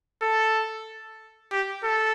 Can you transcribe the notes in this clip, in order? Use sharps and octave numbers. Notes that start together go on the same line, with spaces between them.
A4
G4
A4